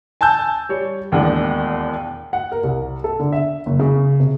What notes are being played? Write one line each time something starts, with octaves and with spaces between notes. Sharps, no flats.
G#5 A5 E6 G6
G3 C#5
E1 D#2 A2 G#3 D4 F#5
F#5
A#4
C2
A4
D3
E5
F#1
C#3
C3